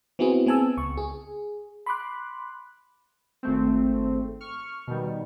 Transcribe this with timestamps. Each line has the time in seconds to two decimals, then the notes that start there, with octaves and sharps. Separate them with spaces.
0.19 B3 C4 E4 F#4 G#4
0.46 B3 C4 G#5 A5 E6
0.77 C#2 C#6
0.97 G#4
1.86 B5 C6 D6 F#6
3.43 G#1 A3 C4
4.41 C#6 F6
4.87 B2 D#3 G3